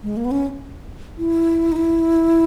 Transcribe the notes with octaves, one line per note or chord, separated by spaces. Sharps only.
G#3
A#3
B3
C#4
E4
D#4
E4